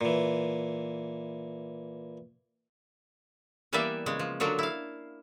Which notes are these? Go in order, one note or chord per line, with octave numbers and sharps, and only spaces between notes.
A#2 E3
E3 G3 A#3 B3 D5 E5
C#3 G#3
F3
D3 F3 F#3 D4 A#4
E4 F5